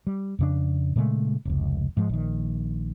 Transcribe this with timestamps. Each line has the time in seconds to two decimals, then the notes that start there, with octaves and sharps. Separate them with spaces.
0.07 G3
0.39 F2 C#3 D4
0.96 A#2 C#3 G#3 A3
1.45 F1 C#2
1.97 G#2 F3 G#3
2.09 A#1 D#3